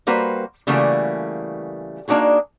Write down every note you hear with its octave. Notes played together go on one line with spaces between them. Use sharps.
G3 A#3 F#4 B4 C5
C#3 E3 G3 A3 A#3 F#4
A#3 D4 D#4 F#4 G#4